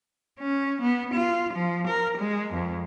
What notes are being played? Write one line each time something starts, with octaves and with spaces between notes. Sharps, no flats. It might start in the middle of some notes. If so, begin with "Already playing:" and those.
C#4
B3
F4
F3
A#4
G#3
F2